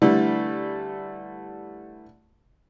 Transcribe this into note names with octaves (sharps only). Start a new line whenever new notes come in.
D3 E3 G3 A3